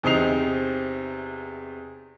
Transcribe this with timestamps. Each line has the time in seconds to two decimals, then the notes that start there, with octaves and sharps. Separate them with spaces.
0.03 E2 C3 C4 D#4 C7 F7